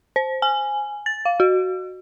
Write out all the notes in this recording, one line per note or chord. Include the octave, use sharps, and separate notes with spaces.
C5
G#5
A6
F5
F#4